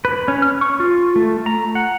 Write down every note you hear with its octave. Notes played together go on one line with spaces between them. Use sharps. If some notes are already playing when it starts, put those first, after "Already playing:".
B4
C#4
F6
C#6
F4
A3
A#5
F#5